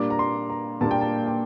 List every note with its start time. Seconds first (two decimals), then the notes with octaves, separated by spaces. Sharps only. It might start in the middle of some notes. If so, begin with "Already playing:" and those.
Already playing: A#2 G3 A#3 D4 D6
0.10 A#5
0.19 C6
0.50 A#5
0.81 A#2 G3 A#3 D4 A5
0.91 G5
1.01 A5
1.27 G5